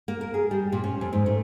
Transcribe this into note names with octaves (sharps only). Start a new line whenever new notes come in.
A#3
A#4
G#4
G3
A#2
C#4
F2
G#2
A3